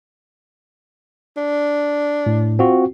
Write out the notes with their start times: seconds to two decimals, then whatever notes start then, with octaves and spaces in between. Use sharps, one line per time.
1.37 D4
2.26 A2
2.59 C4 F4 F#4